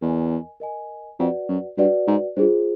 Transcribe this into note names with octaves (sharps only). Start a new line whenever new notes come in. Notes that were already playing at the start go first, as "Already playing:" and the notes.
E2 A#4 D#5 G#5
A#4 D#5 G#5
F2 F#4 B4 D5 F#5
F#2
G2 F#4 B4 D5 F#5
G#2
G2 F4 G#4 C5